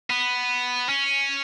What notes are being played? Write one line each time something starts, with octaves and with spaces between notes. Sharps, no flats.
B3
C#4